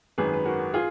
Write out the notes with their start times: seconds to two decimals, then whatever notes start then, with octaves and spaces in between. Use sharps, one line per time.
0.18 G#1 F#2 D#3 G#4 B4
0.34 B4
0.45 F#4 A#4
0.74 F4 G#4